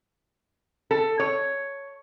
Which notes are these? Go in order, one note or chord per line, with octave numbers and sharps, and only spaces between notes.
A4
C#5